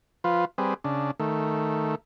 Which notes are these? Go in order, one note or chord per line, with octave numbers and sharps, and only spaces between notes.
F3 F4 B4
G3 C4 G#4 B4
C#3 D4
D#3 A3